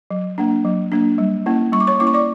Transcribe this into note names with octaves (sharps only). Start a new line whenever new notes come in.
F#3
A#3 D4
F#3
A#3 D4
G3
A#3 C#4 E4
G3 C#6
D6
C#5 C#6
A#3 C#4 E4 D6
C#6
D5 D6